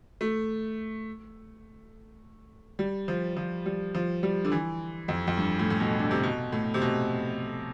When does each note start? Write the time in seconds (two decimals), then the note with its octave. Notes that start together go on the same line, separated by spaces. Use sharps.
0.21 A3
2.79 G3
3.08 F3
3.37 F3
3.66 G3
3.95 F3
4.23 G3
4.44 D3
4.52 E3
5.08 F2
5.27 F2
5.37 G2
5.59 A2
5.70 A2
5.80 B2
5.99 D3
6.11 C3
6.23 B2
6.52 A2
6.74 C3
6.81 B2